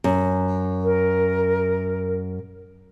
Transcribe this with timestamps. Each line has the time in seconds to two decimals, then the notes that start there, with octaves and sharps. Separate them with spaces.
0.04 F#2
0.84 A#4